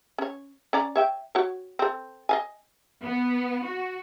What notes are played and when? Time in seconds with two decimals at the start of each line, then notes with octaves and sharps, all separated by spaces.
0.18 C#4 C#5
0.73 C#4 D5 A#5
0.96 C#5 E5 G5
1.35 F#4 C#5
1.79 C4 A4
2.29 D#5 F5 G#5
3.03 B3
3.63 F#4